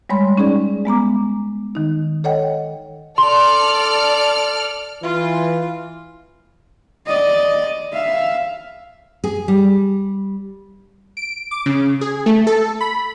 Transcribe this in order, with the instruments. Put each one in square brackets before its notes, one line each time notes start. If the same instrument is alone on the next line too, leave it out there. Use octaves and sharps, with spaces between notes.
[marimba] G3 G#3 C#5 B5 C6
C#4 D#4 G#4 D5
G#3 B3 A#5 D6
D#3 D#4
A4 C#5 D#5 F#5 G5
[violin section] A4 D5 F6 [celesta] C6
[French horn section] E3 [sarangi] F4
[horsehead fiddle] D5 D#5
E5 F5
[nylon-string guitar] G#4
G3
[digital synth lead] D7
D6
C#3
G#4
A3
A4
B5